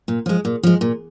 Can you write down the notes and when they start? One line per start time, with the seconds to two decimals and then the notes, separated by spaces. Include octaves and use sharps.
0.08 A#2
0.26 F3 G#3
0.45 A#2
0.63 F3 G#3
0.81 A#2